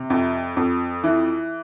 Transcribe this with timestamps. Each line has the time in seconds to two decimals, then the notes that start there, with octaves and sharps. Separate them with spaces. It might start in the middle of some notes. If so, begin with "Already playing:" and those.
Already playing: C3
0.10 F2
0.57 F2
1.04 E3